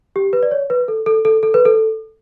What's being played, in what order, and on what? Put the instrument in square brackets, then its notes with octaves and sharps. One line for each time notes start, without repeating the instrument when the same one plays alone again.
[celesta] G4
B4
D5
C#5
B4
A4
A4
A4
A4
B4
A4